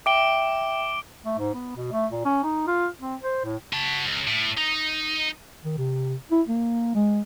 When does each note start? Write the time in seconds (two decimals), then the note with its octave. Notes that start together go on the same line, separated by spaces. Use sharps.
0.06 E5 G5 D6 D7 G7
1.25 A3
1.38 G#2
1.54 B3
1.76 B2
1.92 A3
2.11 A#2
2.25 C#4
2.43 D#4
2.67 F4
3.00 C4
3.21 C5
3.45 A2
3.73 F#4 A5
4.05 C#2
4.27 A2
4.58 D#4
5.64 D#3
5.78 C3
6.32 E4
6.48 A#3
6.95 G#3